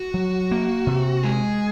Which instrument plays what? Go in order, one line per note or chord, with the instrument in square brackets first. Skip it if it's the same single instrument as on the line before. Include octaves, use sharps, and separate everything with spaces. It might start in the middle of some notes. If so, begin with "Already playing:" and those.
Already playing: [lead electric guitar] F#4
[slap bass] F#3
A#3
C3
[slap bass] G#3 [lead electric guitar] G#4